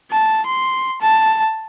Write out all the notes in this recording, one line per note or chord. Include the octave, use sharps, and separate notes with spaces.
A5
C6
A5